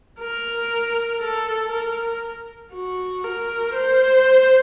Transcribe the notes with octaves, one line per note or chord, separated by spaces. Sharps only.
A#4
A4
A#4
F#4
A#4
C5